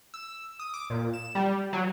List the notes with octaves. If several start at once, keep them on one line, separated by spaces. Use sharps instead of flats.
E6
D#6
D6
A#2
E7
G3
F#3